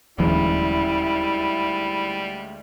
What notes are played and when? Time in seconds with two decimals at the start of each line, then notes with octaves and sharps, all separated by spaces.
0.19 D#1 D2 G#2 C#3 E3 F#3 G3 E4